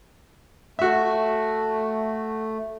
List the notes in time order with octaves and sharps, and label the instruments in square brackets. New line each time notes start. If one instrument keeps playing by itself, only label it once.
[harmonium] A3 [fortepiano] F#4 E5